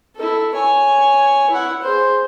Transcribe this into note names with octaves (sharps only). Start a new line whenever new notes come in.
E4 A4
C#5 G#5
E4 F#5
G#4 C5